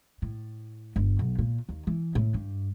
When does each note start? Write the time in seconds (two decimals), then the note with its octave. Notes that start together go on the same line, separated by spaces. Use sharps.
0.22 A2
0.96 G1
1.19 B1
1.39 A#2
1.69 D#2
1.87 E3
2.15 A2
2.34 G2